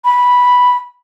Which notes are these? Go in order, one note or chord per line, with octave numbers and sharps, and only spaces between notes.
B5